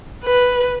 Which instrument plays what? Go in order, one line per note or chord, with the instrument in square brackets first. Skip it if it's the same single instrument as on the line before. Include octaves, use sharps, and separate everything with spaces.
[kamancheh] B4